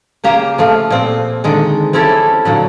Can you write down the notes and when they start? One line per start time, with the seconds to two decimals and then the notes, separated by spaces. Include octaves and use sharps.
0.24 C#3 A#3 G4 A#5
0.58 F3 A3 F4
0.90 A#2 C4
1.44 D3 D#3 G#3
1.93 C4 C#4 E4 G4 A4
2.45 A#2 D3 F#3